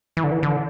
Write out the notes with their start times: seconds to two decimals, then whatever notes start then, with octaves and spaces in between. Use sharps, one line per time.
0.17 E3
0.24 D3
0.31 E3
0.43 D3